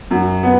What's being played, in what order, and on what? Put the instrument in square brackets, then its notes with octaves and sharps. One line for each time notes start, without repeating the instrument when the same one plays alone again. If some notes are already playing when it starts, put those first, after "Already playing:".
[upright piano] F#2
B3